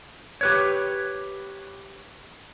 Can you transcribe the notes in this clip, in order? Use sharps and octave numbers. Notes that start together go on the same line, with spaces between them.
G4 B4 C#5